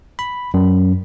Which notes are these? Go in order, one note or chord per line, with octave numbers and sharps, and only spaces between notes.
B5
F#2